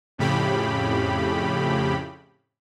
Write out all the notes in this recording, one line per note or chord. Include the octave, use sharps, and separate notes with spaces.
F2 A2 C#3 G4 B5